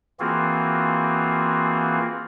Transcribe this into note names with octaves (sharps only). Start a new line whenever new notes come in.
E3 A#3 C4 F4 F#4 G#4